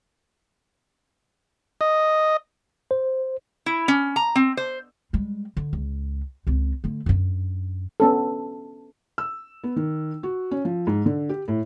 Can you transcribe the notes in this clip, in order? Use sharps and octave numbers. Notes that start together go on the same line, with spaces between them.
D#5
C5
E4
C#4
A#5
C4
C5
G3 G#3
D3
C#2
C#2 C4
D3 A3
F#2 D4
B3 C#4 A4
E6
B3
D#3
F#4
C#4
F3
G#2
D3
G4
A2